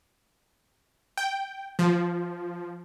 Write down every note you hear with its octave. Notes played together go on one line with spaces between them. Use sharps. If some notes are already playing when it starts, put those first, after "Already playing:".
G5
F3